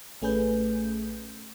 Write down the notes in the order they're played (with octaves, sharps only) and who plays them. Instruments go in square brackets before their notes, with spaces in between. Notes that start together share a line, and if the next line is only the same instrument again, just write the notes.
[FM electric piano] A1 A3 C#4 G#4 B4 G6